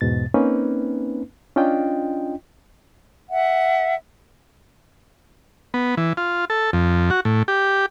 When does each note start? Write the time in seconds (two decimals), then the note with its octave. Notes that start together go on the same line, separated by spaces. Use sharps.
0.01 E2 G#2 B2 A6
0.34 A#3 C4 C#4 D#4 B4
1.56 C#4 D4 F4 D#5 G5
3.30 E5 F#5
5.74 B3
5.97 E3
6.17 F4
6.50 A4
6.73 F2
7.10 F#4
7.25 A2
7.48 G4